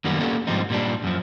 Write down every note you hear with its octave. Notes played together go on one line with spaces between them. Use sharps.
F#2 D#3 G3 A#3 B3
A#3 B3 C#4 D4 G4 A4
G#2 C3 F3 G3 C4 D#4
A#2 G3 D4
F#2 F3